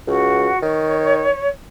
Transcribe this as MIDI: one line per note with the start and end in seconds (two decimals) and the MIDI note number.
0.07 0.50 37
0.07 0.59 66
0.63 1.28 51
0.63 1.48 73